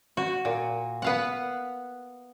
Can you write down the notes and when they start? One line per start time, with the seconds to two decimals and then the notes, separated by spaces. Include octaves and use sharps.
0.17 F#4
0.45 A#2
1.02 B3 F5 F#5